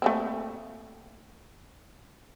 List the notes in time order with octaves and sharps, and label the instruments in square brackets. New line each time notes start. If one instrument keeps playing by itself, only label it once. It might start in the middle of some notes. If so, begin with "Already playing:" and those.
[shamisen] A3 A#3 C4